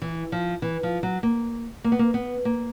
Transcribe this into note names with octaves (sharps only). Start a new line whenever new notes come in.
E3
F3
E3
F3
F#3
A#3
A#3
B3
A#3
B3
A#3